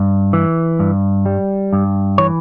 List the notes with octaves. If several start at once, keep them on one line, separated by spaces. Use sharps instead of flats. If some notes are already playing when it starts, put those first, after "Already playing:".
Already playing: G2
E3
G2
G3
G2
E3 C#5